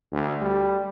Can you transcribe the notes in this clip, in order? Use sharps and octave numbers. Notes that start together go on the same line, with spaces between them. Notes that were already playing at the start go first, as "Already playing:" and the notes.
D2
G3